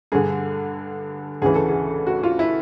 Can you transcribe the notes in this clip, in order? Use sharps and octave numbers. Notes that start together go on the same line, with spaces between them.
G2 D3 G#4
D2 C#3 E3 G#4
A4
G#4
F#4
F4
E4